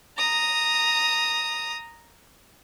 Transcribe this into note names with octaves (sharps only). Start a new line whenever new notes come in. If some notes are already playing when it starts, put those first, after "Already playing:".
A#5 D#6